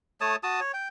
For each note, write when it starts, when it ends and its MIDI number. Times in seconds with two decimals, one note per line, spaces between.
0.21 0.36 57
0.21 0.36 73
0.21 0.36 81
0.21 0.36 87
0.43 0.60 66
0.43 0.60 81
0.43 0.60 87
0.60 0.72 73
0.74 0.88 79